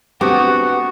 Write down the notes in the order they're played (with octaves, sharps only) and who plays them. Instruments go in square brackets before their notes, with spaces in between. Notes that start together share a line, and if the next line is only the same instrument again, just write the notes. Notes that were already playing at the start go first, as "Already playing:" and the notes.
[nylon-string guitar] A3 C4 D4 [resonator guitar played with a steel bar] B3 [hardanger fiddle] F#4 [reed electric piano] G4 D6